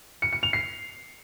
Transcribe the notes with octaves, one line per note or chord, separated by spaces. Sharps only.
C#7
C#7
F7
C7